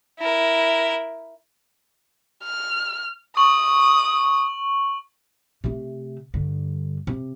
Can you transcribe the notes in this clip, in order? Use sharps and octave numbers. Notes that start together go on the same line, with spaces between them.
E4 A#4
F6
C#6 D#6 F#7
C3 A3
G2 D3
C3